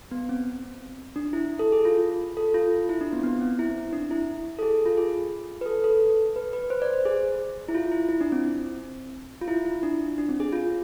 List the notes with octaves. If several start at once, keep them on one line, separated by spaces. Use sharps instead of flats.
B3
C4
D4
E4
A4
G#4
F4
A4
F4
E4
D4
B3
C4
B3
C4
E4
D4
E4
A4
G#4
F4
G#4
B4
A4
A4
B4
B4
C5
D5
C5
G#4
E4
F4
E4
E4
D4
C4
C4
F4
E4
E4
D4
D4
C4
G#4
F4